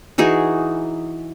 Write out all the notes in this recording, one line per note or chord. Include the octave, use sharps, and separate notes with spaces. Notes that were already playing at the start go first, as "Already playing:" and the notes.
E3 D#4 F#4 G#4